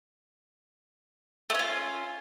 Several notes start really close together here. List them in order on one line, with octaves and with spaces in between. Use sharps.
A3 C#4 F4